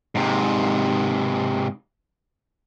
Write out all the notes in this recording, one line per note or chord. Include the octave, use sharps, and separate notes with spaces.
G#2 C3